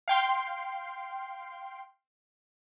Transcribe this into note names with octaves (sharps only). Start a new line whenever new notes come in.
F5 G5 C6